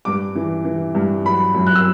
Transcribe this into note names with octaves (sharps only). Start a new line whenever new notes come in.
G2 D6
E3
E3
G2
F#3 B5
F#2
F#6
E6